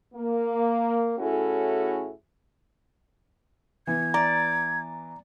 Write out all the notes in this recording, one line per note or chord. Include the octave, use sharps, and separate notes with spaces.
A#3
A2 C#4 E4 F#4 G#4 A4
E3 B3 G#6
D5 A#5